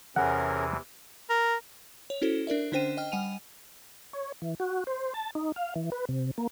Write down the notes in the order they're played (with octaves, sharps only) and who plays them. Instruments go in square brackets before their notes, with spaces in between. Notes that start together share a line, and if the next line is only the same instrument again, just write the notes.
[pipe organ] E2 C3 E3 [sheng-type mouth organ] C#4 G#4 A#4 [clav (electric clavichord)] F#5
[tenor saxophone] A#4
[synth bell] C#5
C#4 E4 F#4 A4 C5
D4 A#4 D5 E5
D3 C#4 D4 C5 G5 D#7
D#5 G5 F6
G3 F#5 G#5 D#7 F7
[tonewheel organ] C#5
E3
F#4
C5
A5
D#4
F5
E3
B4
C3
A#3